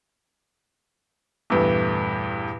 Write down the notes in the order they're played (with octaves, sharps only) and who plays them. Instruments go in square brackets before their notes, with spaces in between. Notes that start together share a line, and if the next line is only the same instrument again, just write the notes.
[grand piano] E2 G2 A3 [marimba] A#2 B4 E6